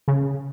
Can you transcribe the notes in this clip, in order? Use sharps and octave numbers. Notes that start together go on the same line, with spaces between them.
C#3